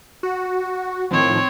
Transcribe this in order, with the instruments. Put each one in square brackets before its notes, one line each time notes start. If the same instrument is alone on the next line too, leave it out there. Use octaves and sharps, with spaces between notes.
[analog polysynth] F#4
[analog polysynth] A2 D#3 F3 [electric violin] C4 C#5